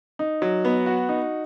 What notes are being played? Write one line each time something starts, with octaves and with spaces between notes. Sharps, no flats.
D#4
F#3
B3
F#4
D#4